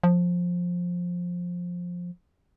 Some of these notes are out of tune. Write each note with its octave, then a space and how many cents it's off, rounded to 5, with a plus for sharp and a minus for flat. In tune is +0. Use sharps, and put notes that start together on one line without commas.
F3 +15